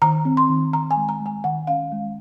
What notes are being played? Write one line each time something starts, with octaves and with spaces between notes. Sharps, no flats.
D#3 A#5
C4
C6
D#3
D#3 A#5
G#5
G#3
A#5
G#3
G#5
D#3 F#5
C#4 F5
G#3